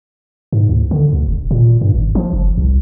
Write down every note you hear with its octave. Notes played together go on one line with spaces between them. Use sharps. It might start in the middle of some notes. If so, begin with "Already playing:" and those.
G#2
D2
D3
D2
E1
A#2
G2
G#1
F3
F#1
C2